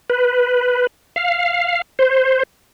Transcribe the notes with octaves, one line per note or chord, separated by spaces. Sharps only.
B4
F5
C5